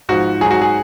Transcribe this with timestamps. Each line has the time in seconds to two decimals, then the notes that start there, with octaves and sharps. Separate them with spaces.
0.09 G#2 F3 F#4
0.41 G#2 F#3 G#4
0.51 F#4
0.62 G#4